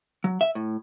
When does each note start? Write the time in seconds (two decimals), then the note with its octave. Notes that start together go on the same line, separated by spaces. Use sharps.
0.24 F#3
0.41 E5
0.55 A2